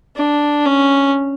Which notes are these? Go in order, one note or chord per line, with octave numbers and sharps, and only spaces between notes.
D4
C#4